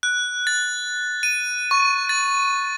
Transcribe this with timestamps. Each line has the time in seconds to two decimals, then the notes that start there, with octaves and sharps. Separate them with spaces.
0.03 F#6
0.47 A6
1.23 D#7
1.71 C#6
2.09 A6